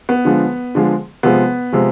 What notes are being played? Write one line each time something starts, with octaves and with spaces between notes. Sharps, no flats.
B3
D3 F3 G#3
D3 F3 G#3
C3 F3 G#3 B3
C3 F3 G#3